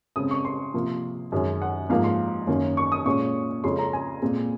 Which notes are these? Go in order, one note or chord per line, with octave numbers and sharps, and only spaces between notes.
C#3 G#3 C4 D#6
C#6
C6
C3 F3 A#3
F#2 D#3 G#3 C#4
F#5
G#2 F3 A#3 F5
C6
F#2 D#3 A#3 C#4
C#6
D#6
A#2 G#3 C#4 C#6
F2 C#3 G#3 C#4 C6
A#5
G#5
A#2 G#3 C4